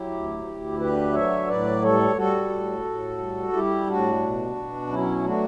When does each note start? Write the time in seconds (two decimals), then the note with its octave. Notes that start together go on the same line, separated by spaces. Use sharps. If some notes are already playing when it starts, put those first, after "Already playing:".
Already playing: F#3 E4 G4
0.11 D2
0.45 D2
0.79 D3 G4 B4
1.13 F#3 C#5 E5
1.47 A2 B4 D5
1.82 G3 A4 C#5
2.15 G3 F#4 A4
2.49 A2
2.84 A2
3.18 G3
3.52 G3 E4 G4
3.87 A2 D4 F#4
4.21 B2
4.56 B2
4.89 F#3 C#4 E4
5.24 A3 D4 F#4